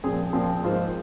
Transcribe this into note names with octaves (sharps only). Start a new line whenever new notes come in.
A#2 F3 C4 G#4
A#2 F3 C4 G#4
G#2 F3 A#3 F4 C5